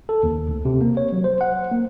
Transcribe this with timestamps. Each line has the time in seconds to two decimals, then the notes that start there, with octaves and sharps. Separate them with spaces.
0.09 A4
0.23 D#2
0.49 D2
0.65 C3
0.81 A#3
0.97 C#5
1.12 F#3
1.24 C5
1.41 F#5
1.71 A#3